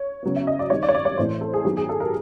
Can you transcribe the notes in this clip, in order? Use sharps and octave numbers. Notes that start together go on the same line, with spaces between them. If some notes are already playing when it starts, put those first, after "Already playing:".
Already playing: C#5
C#3 F#3 B3
E5
D#5
D5
D#3 G3 C4 C#5
D5
C#5
D5
C#5
A2 E3 A3 C4 C5
A4
G#4
D#3 F#3 B3 G4
G#4
A4
A#4